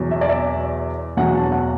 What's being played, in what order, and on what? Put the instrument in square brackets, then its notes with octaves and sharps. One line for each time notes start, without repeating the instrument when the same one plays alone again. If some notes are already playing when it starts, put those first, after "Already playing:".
Already playing: [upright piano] E2 B2 F#3
E5
D5
E5
E2 B2 F#3 F#5
A5
F#5